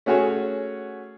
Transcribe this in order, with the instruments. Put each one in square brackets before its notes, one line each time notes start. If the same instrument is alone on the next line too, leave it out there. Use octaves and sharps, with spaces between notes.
[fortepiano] A3 C#4 F#4 G#4 C#5